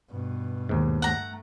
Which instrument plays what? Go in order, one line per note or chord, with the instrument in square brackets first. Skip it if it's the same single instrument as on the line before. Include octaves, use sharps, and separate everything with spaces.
[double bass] G2 B2
[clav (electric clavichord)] D#2 G#2
[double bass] A3 [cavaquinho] F#5 A#5